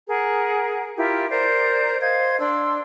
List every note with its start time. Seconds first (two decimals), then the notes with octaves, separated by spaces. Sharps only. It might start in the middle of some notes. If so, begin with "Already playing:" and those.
0.08 G#4 A#4 F#5
0.97 E4 F4 G4 A#4
1.30 A#4 C5 D5 G6
2.01 C5 D#5 F5 G#6
2.40 D4 C6 E6